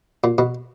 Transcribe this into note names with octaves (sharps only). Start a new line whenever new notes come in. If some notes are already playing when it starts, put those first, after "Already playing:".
A#2
B2